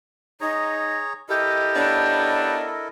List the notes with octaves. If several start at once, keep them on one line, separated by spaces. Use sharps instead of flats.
D#4 G#4 C#5 A#5
E4 G4 A4 A#4 D#5
B3 C#4 D4